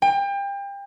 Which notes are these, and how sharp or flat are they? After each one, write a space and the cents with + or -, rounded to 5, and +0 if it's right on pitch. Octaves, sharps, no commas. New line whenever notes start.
G5 +30